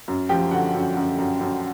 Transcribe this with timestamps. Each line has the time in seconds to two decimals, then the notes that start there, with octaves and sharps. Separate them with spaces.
0.08 F#2
0.29 F3 G4 G5
0.51 D3 F#4 F#5
0.74 F#2
0.96 F#2
1.18 F#2
1.41 F#2